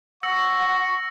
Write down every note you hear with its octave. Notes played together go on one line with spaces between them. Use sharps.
F#5 C#6 E6 A#6 C#7